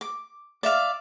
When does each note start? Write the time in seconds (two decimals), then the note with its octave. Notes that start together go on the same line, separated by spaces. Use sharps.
0.01 D6
0.63 D5 E5 F5